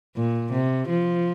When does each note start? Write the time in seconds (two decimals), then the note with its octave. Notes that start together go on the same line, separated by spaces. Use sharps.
0.16 A#2
0.52 C3
0.89 F3